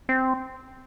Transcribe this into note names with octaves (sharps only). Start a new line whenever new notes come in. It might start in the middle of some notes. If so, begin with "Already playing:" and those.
C4